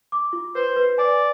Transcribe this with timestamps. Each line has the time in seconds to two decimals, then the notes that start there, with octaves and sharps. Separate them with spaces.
0.12 D6
0.33 F4
0.55 B4 C5
0.76 B4
0.98 D5 G#5